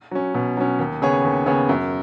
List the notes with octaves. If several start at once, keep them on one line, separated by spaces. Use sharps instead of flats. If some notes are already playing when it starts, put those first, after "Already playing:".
F#3 C#4
B2
F#3 C#4
D#2
C#3 B3 G#4 C#5
D#2
C#3 B3 G#4 C#5
F#2